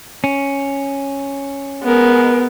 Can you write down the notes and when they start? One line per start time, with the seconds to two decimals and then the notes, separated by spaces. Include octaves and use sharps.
0.24 C#4
1.83 G#3 B3 A#4